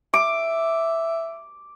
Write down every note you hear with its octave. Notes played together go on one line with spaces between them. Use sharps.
E5 D6